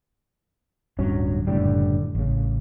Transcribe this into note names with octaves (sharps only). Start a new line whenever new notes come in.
D1 G2 F#3 C#4
F#1 A2 D3 G3
A1 C#3